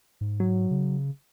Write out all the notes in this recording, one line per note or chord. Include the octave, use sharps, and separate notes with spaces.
G#2
F#3
C#3